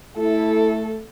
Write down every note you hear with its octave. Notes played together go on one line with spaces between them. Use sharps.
A3 E4 A4